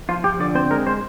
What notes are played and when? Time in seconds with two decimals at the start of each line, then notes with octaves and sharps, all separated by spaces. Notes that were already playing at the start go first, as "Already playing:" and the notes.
0.09 F3 F4
0.24 F3 G4
0.40 D3 D5
0.55 C4 C5
0.71 G#3 A#4
0.87 G#3 C5